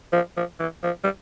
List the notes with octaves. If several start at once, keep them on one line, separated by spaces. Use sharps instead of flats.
F3
F3
E3
F3
G3